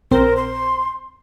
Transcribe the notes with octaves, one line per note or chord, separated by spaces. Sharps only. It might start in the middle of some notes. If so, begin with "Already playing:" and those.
A#1 C4 A#4 C5
C6